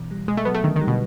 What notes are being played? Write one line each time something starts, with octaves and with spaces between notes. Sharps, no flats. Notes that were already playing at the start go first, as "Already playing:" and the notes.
Already playing: B2 E3
G3
B2 G#3
A3
F#3 B3
A3
D3 D#3
D#3
G3
B2